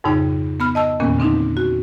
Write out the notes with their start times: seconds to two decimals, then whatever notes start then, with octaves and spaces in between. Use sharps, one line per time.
0.04 F2 G#2 C#3 D#4 G5
0.60 B3 B5 F6
0.75 D#5 A5 E6
1.00 E2 A#2 D#3 A#3 B3 C#4
1.19 D3 C4 D4 D#4
1.57 F#4